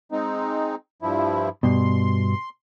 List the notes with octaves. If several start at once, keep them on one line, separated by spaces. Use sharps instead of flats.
G#3 C4 D#4
G2 F3 E4
G2 B2 C6